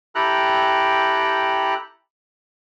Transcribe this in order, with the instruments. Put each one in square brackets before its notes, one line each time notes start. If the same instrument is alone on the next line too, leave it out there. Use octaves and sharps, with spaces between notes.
[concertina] E4 G4 A4 G5 A#5 F#6